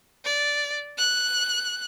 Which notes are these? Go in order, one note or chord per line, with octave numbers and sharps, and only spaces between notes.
D5
F#6